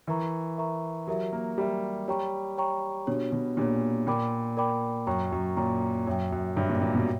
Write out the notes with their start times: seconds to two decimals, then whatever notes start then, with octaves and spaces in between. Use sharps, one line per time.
0.07 E3 A#4 E5 A#5 C#6
0.58 A#4 E5 A#5 C#6
1.07 F#3 G4 A#4 E5
1.33 A#3
1.58 G3 G4 A#4 E5
2.08 G3 C#5 G5 A#5 C#6
2.58 C#5 G5 A#5 C#6
3.07 B2 D4 G4 C#5
3.32 B2
3.57 A#2 D4 G4 C#5
4.07 A#2 A#4 D5 G5 B5 D6
4.57 A#4 D5 G5 B5 D6
5.07 F#2 C#5 G5 A#5 C#6
5.32 F#2
5.56 A#2 C#5 G5 A#5 C#6
6.07 F#2 C#5 E5 G5
6.32 F#2
6.57 G2 C#5 E5 G5
6.69 A#2
6.82 A#2
6.95 B2